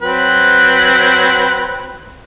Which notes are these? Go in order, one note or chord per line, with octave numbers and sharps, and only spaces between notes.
F#3 C4 B4